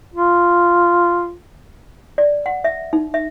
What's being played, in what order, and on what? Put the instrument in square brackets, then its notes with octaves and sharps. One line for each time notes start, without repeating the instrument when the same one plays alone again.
[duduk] F4
[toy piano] D5
F#5
E5
D#4
E5